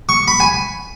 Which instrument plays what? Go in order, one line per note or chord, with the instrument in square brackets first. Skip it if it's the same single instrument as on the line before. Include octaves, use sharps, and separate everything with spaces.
[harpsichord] C#6
B5
G#5